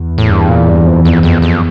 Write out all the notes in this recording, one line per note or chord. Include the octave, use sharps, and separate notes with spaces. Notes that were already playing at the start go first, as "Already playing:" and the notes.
Already playing: E2
A2
G2
A#2
G2
F2
F2
F2
F2